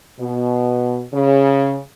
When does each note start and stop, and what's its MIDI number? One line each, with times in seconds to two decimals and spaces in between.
0.19 1.01 47
1.13 1.77 49